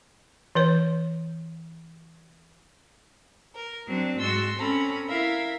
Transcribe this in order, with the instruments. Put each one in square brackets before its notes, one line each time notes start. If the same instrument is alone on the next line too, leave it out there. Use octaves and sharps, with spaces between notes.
[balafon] E3 B4 C#5
[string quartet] A#4
F#3 C4 D4
G#2 G#3 F#4 C6 E6 A6
C4 C#4 A4 A#5 B5
E4 A#4 E5 F5